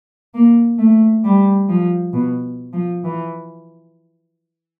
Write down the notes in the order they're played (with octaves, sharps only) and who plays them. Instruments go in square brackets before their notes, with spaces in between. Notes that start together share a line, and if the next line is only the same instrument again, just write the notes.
[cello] A#3
A3
G3
F3
B2
F3
E3